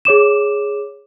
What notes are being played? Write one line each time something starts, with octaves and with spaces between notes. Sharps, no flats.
G#4 C#5 D6 E7